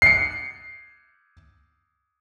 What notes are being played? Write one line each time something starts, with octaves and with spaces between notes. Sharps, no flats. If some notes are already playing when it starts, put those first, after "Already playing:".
C7 C#7